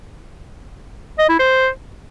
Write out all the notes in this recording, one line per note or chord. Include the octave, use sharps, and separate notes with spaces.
D#5
E4
C5